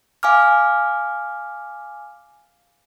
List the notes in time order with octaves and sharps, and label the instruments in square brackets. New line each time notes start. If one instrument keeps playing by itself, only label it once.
[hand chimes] F5 G#5 D6 F6